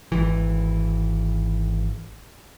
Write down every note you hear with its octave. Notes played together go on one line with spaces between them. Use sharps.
G#1 E3